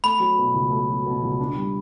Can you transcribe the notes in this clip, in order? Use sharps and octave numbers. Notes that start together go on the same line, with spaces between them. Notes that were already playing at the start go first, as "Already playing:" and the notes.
A3 B5
F#3
B2
C#2
A3
F#3
B2
C#2
D4
G3